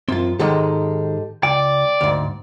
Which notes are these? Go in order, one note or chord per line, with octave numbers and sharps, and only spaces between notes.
F#2 C4 F4
G#2 D#3 G#3 G4 A4 D#5
C#2 D5 G5
D2 G#2